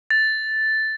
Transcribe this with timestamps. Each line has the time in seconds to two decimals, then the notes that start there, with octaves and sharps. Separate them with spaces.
0.11 A6